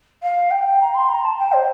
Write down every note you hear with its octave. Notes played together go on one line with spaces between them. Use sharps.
F5
G5
A#5
C6
A#5
A5
G5
C5